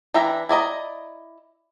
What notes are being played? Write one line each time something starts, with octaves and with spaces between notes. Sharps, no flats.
E3 D4 E5 G5 A#5
E4 D5 D#5 A#5